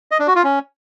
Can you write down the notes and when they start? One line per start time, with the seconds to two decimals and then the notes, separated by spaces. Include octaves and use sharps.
0.11 D#5
0.19 D4
0.28 F#4
0.36 F4
0.44 C#4